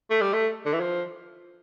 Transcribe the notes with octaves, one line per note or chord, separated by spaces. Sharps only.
A3
G3
A3
D3
E3
F3